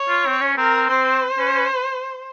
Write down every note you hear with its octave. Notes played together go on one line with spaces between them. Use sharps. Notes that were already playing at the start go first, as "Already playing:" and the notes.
Already playing: C#5
F4
C4
C#4
C4 A#4
C4 C5
C#4
C#4